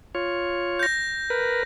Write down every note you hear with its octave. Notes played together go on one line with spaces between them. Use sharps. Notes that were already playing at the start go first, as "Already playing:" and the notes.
F4 C#5
G6 A#6
A#4 B4